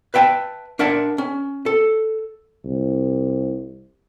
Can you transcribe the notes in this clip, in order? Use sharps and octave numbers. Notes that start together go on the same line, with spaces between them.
B4 E5 G5 A5
D4 A#4 E5 F#5 A5
C#4
A4
C2